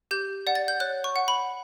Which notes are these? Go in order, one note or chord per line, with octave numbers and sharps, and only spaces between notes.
G4 G6
D5 F#5
A6
G6
C#5 F#6
C#6
F#5
B5